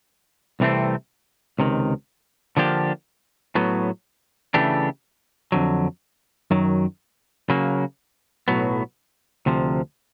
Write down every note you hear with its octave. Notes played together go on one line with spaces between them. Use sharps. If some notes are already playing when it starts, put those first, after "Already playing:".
C2 C3 E3 A3 C4
C#2 C3 D#3
D3 F3 A#3 D4 G4
A2 F#3 B3
C#3 E3 A3 D4 G4
F2 D3 F#3
F#2 D#3 F#3
C#3 F#3 A#3
B1 A2 F#3 B3
D2 C3 F3